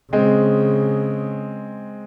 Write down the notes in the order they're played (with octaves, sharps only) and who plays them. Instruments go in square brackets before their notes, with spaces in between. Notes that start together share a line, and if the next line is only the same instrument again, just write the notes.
[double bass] C#3 [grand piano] G#3 C4